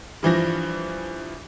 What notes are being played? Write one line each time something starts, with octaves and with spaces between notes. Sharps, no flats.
G2 E3 F3 A#6